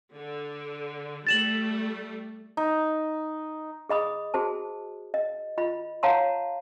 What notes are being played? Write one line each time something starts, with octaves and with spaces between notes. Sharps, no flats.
D3
G3 A3 A6 E7 F#7
D#4
G#4 D#5 B5 D#6
F#4 G#4 C5 A5
D#5
F4 D#5 B5
C#5 F5 F#5 A5 A#5 C6